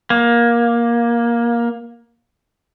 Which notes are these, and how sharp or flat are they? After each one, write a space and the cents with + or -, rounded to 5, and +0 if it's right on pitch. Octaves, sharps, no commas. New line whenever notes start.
A#3 +15